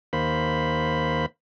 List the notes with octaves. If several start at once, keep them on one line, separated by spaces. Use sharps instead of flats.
D#2 A#3 C5 B5